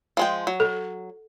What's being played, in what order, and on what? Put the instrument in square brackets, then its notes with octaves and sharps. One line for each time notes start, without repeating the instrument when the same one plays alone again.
[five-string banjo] F3 G#3 G5
F#3
[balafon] A4